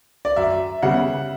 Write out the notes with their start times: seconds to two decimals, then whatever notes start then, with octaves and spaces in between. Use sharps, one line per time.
0.25 D5
0.36 F#2 E5
0.82 C#3 G3 B3 F#5